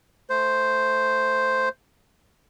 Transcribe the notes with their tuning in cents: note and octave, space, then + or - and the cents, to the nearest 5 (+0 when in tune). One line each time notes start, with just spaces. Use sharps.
A3 +0 C5 +0